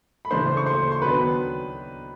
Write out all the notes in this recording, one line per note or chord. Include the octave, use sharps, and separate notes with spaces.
B5
C#3 E3 A3 D4 C5 C6
C#6
C5 C6
C6
D#3 F#3 B3 D4 B4 B5